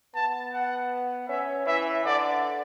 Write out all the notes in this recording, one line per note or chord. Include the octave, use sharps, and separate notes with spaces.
B3 A5
F#5
C#4 E5
E3 E5
D3 D5